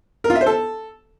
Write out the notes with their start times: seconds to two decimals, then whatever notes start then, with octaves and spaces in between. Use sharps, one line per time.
0.24 A#4
0.30 F4
0.35 E5
0.41 C5
0.46 A4